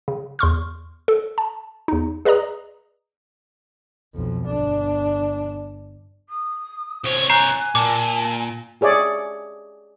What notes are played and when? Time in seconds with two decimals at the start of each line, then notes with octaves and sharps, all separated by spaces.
0.08 C#3
0.39 E2 C6 C#6 F6
1.08 A4
1.38 A5
1.88 E2 D#4
2.25 G#4 B4 D5 D#5 A#5 D#6
4.14 B1 F2
4.46 G1 D4
6.29 D#6
7.04 C2 C5 C#5
7.29 G#5 A#5 F#6 G6 C7
7.75 A#2 A5 D6
8.81 G4 G#4 C#5 D5 E5